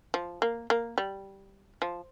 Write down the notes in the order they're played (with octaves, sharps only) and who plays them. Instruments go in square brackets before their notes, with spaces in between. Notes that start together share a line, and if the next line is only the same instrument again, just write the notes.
[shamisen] F3
A#3
A#3
G3
F3